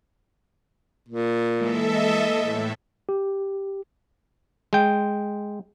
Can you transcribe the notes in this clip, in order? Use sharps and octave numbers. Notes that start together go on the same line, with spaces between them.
A#2
E3 G#3 A#3 A4 E5
D#5
A2
G4
G#3 G5